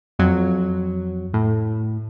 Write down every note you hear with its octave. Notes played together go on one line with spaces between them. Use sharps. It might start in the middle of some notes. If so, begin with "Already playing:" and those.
F2 F#3
A2